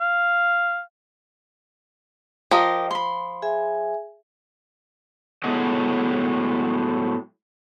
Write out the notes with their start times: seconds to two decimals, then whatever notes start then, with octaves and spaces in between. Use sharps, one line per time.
0.01 F5
2.51 F3 G4 A#4 D#5
2.91 B5 C6
3.42 G#4 E5 G#5
5.44 A2 F#3 G#3 A3 B3 D#5